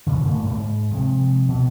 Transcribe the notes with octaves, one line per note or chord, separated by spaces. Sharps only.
A#2 D3
G2 A#2 A3 A#3
G#2
C3 F3 G#3
B2